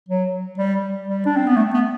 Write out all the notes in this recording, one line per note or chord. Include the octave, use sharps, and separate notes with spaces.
F#3
G3
G3
D4
C4
B3
A3
B3